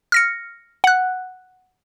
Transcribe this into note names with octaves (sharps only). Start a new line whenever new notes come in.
F6 A#6 C#7
F#5 F#6